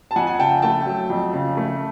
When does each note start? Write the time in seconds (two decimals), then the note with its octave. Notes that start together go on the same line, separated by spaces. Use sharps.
0.11 A5
0.16 F2 F#5 G#5
0.27 G#5
0.39 C#3 G5 A5
0.62 A3 G5 A5
0.86 F#3
1.10 F2
1.33 C#3
1.57 A3